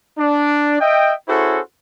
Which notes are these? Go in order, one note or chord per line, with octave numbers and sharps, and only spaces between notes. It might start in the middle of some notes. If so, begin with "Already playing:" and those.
D4 D5
D#5 E5 G5
C#4 E4 F#4 G#4 A4 C5